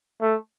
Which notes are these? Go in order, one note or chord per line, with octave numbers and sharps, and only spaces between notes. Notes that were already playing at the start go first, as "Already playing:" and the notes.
A3